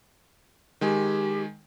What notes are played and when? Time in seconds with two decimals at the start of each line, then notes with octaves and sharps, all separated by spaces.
0.81 D#3 G#3 G4 G#5